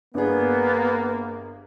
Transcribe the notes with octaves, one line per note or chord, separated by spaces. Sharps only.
G1 A#3 B3 D4 G#4